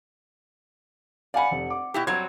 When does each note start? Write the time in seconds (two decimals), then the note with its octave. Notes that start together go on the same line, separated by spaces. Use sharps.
1.34 D5 F5 F#5 G#5 B5
1.51 F1
1.70 D6
1.94 B2 E4 G4
2.07 F#3 G3 C4 G#6